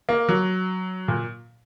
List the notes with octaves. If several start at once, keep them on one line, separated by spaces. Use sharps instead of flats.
A#3
F#3
A#2